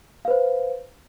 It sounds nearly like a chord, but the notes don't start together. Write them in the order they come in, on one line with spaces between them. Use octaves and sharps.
F5 B4 C5